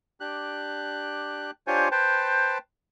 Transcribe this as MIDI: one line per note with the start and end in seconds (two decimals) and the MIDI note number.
0.20 1.51 62
0.20 1.51 67
0.20 1.51 90
1.67 1.89 62
1.67 1.89 65
1.67 1.89 67
1.67 1.89 72
1.67 1.89 73
1.67 1.89 80
1.92 2.58 71
1.92 2.58 72
1.92 2.58 79
1.92 2.58 81